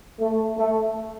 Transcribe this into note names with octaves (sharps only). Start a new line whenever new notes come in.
A3
A3